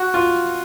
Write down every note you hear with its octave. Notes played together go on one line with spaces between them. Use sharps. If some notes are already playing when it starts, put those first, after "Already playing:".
Already playing: F#4
F4